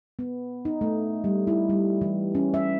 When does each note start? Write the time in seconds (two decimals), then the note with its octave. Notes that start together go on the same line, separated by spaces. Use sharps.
0.19 B3
0.65 D#4
0.81 A3
1.24 G3
1.47 E4
1.69 G3
2.01 E3
2.35 C#4
2.54 E5